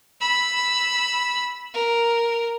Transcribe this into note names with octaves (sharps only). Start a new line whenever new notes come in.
B5 E6
A#4